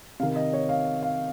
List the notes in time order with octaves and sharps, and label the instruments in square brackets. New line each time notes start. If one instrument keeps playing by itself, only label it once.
[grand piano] C3 F5
D#3
D#5
C#5
F5
F5